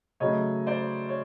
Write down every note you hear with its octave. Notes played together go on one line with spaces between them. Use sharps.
C#3 F#3 A3 C#5 D#5
C5 D5
C#5